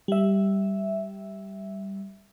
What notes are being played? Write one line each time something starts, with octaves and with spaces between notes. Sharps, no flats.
G3 E5